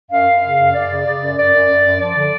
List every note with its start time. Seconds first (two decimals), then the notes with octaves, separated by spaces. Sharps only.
0.11 F#2 F5
0.27 F#2
0.43 C#3
0.59 F#2
0.74 F#2 D5
0.90 C#3
1.05 C#3
1.21 F#2
1.37 F#2 D5
1.53 F#2
1.68 F#2
1.84 F#2
1.99 F3 D5
2.15 D3